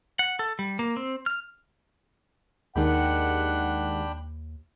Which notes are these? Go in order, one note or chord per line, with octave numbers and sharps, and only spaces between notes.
F#5
A4
G3
A#3
C4
F6
D#2 D#3 G#3 D4 G4 F#5 G5 B5